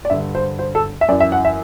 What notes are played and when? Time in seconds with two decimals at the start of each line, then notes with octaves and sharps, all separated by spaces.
0.05 D5
0.10 G2 D3 E5
0.35 C5
0.59 C5
0.75 A4
1.01 E5
1.08 F#2 D5
1.12 E3
1.20 E5
1.32 F#5
1.45 E5